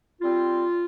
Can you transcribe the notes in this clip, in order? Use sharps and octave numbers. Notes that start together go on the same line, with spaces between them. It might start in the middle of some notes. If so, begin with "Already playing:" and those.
G3 C4 F4